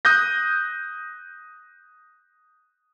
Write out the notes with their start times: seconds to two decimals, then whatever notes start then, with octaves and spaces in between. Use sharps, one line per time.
0.05 D#6 F#6 G6 A#6